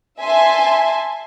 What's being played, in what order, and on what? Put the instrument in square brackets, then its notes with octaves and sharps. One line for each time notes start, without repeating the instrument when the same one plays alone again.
[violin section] E5 G#5 A5 C6